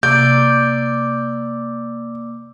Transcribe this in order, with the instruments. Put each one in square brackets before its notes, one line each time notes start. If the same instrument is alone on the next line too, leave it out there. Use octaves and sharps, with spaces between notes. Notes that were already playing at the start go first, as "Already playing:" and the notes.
[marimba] C3 [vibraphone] A#3 D6 E6 [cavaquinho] D5 [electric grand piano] G6